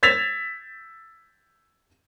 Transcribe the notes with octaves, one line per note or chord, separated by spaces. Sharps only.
E6 G#6 A6 B6 E7 F7